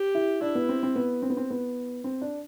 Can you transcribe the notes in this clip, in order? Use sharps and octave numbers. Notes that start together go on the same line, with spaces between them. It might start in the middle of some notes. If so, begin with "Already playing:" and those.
Already playing: G4
E4
D4 E4
B3
C4
C4
B3
C4
B3
C4
B3
C4
D4